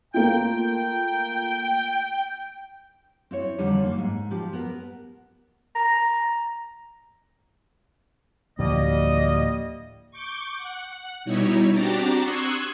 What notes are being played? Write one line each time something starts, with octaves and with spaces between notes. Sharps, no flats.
A3 A#3 F4 G5
C4 E4 C#5
F2 D3 D#3 G3
F#2 A#3
G#2
F3 G4
B3 A#4
A#5
D2 A2 F3 G3 A#3 D#5
C#6 D6 G6
F#5
B2 G3 D#4 E4 C#5
C4 D4 F#4 G4 A#5 A6
C6 C#6 D#6 E6 F#6 G#6